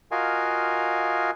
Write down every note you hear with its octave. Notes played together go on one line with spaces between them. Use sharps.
F4 F#4 A#4 D#5 F5 G#5